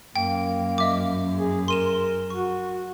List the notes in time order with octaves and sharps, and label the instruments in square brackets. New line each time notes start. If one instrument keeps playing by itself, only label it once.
[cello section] F#2 [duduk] A#3 [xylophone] G5
[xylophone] D#5 E5 D6
[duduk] G#4
[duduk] A#4 [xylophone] C6 D#7 E7
[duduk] F#4 [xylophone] C#6